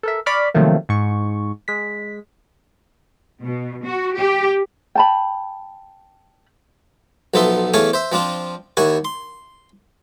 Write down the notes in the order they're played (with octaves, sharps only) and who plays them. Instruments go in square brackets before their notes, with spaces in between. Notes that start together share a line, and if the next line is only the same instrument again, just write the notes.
[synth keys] A4 A#4 E5
D5 B5 C#6 D6 F6
C3 D#3 F3 F#3 A3 A#3
G#2 C#6
G#3 B6
[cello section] B2
F#4
G4
[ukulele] G5 A5 B5
[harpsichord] B1 F3 B3 A4 E5 C6
E2 A3 A4 C#5 F5 G#5
C5 E5
F3 C4 D4 F4
D#2 E4 F#5 G#5 C#6
C6